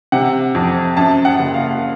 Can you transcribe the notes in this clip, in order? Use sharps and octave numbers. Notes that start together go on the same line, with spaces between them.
C3 F#5
F2
F#2 A5
F#5
F#1
F5